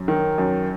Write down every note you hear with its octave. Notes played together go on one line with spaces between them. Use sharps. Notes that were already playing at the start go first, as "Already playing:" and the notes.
Already playing: F#2
D#3
F#2